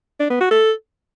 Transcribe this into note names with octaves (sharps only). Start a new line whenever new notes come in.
D4
B3
F#4
A4